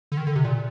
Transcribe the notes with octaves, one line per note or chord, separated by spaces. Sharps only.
D3
D#3
D3
C3
A#2